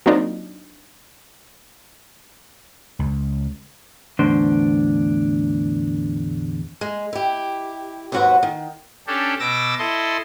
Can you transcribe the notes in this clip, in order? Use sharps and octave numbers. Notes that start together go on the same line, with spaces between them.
F#3 A#3 C4 D4 D#4 F4
C#2
E2 A2 D3 D4 C5 C6
G#3
E4 G4
D#2 G#2 F#3 F#4 B4 F#5
D#3
C#4 D4 G4 A4
B2 D6 E6 A#6
E4 A4 D#5 C6